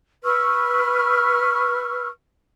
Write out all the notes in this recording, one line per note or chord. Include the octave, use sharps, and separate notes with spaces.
B4 C#6 E6 F6